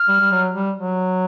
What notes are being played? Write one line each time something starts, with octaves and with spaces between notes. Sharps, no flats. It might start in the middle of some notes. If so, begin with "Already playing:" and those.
Already playing: F6
G3
G3
F#3
G3
F#3